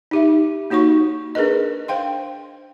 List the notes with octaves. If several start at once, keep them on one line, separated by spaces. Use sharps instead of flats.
D#4 G4 E5
A#3 D#4 F#4 C#5 C#6
D4 G#4 A#4 B4 D#5
C5 F5 G5 C6